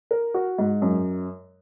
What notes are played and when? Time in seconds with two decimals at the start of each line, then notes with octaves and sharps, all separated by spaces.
0.11 A#4
0.34 F#4
0.58 G#2
0.82 F#2